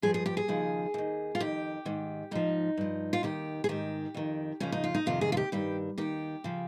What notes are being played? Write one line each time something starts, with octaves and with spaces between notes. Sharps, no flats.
G2 F3 G#4
G#4
G4
G#4
D#2 C#3 F3
D#2 D#3
F4
F2 D#3 G4
G#2 D#3
G#2 F3 D#4
G2 F3
F4
D#2 D#3 G4
G#4
G#2 D#3 G4
F2 D#3
F2 C#3 F3 C#4
D#4
F4
D#4
F2 C3 D#3 F4
G#4
F4
G4
G2 D#3 G4
D#2 D#3 G4
C#3 F3